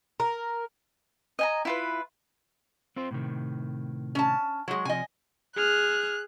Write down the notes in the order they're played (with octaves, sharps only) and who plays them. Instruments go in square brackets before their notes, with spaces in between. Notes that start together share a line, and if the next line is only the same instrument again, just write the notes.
[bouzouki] A#4
[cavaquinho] D#5 G#5 A#5
E4 F4 B4
[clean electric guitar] C4 F4 C5
A2 C3 D#3
[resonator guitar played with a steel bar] C#4 A5
F#3 G#3
[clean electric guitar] C3 F3 [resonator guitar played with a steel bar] D#5 G#5
[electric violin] G#4 F6 [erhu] F#6